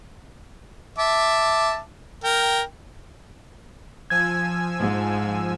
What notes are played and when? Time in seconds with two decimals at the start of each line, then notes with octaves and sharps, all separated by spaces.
0.98 E5 A5 D6
2.24 A#4 G5
4.10 F3 G#5 E6 G#6
4.79 G#2